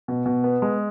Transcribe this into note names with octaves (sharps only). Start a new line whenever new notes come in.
B2
B2
B3
G#3